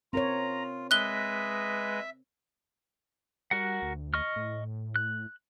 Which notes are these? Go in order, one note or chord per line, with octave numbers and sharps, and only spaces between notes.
C4 F4 A#4 C#5 A#5
G#3 B4 D#5 E5 F#6 G7
G3 F#4 A#4 F#5
D2
D#5 C#6 F6
A2
F#6